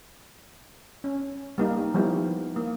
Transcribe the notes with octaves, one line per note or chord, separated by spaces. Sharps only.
C#4
G3 A#3 D#4
F3 G3 B3 D#4 E4
A#3